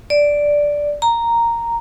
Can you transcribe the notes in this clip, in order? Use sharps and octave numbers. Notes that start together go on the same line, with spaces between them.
D5
A#5